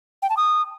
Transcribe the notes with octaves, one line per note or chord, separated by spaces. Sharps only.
G5
A5
D#6